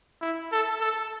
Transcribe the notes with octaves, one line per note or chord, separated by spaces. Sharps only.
E4
A4
A4